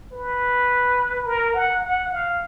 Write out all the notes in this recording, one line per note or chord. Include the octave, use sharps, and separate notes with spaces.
B4
A#4
F#5
F#5
F5